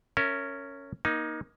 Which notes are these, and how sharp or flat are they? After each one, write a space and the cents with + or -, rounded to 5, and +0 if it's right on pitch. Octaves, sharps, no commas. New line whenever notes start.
C#4 +0 A#4 -25 E5 +0
A#3 +25 D#4 +0